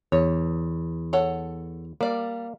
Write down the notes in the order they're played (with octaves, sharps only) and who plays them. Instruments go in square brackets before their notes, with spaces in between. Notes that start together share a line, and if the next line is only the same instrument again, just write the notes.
[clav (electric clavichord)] E2 [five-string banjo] C#5
[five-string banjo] A4 C#5 F#5
[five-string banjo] G3 D5 [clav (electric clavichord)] A#3